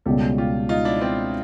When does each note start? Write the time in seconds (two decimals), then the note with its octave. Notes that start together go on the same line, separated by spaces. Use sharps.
0.06 C#2 B2 G3 G4 A4
0.38 F4 G4
0.69 D#4 F4
0.85 D4 E4
1.01 C4 D4